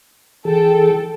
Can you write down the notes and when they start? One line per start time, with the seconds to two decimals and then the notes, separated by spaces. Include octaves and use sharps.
0.45 E3 G#4 A4 G5